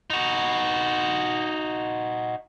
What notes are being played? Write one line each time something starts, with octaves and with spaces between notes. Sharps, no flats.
D#4 F#4